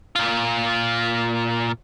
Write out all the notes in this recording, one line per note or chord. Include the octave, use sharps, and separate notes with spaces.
A#2 F4